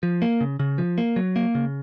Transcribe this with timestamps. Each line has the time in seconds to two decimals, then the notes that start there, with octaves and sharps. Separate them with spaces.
0.03 F3
0.22 A#3
0.41 C#3
0.60 C#3
0.78 F3
0.98 A#3
1.16 F#3
1.36 A#3
1.55 C#3